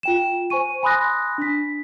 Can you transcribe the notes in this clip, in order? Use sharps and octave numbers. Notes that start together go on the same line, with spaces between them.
F4 G5 E7
C5 G#5 C#6 D#7
G#5 B5 C6 D#6 F#6 A#6
D4 B6